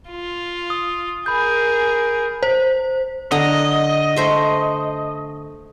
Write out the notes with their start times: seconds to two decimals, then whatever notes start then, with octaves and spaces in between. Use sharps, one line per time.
0.10 F4
0.70 D#6
1.26 G#4 A#4 B5 G6
2.43 C5
3.31 D3 D#5 A#5
4.16 A3 C5 E5